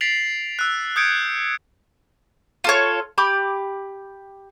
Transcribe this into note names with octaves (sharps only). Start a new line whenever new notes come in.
A6 B6 C7 D7 F7 F#7
E6 F#6
D#6 G6 G#6 C#7 D7
F4 A4 C#5
G4 B5 D6